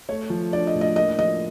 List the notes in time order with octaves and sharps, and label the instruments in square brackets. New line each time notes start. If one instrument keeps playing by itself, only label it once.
[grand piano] A3 [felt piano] C#5
[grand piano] F3
[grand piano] D4 [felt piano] D5
[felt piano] D#5
[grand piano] A2
[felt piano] D#5
[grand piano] A#3 [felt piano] D#5
[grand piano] F3 [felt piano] D#5